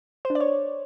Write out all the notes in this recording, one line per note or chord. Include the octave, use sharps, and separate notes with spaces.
C5
D4
D5
C#5